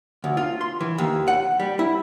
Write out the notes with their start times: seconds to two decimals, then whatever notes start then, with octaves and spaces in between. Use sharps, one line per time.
0.24 D2
0.37 F4
0.61 C6
0.81 E3
0.98 D#2
1.28 F#5
1.60 G3
1.79 E4